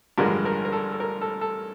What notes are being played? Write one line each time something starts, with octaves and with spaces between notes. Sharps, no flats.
A1 G2 D3 F3 G#3 A#4
A#4
A#4
A4
A4
A#4
A4
A4